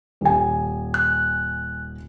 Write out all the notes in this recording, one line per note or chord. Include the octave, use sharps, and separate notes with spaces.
D#1 G#5
F#6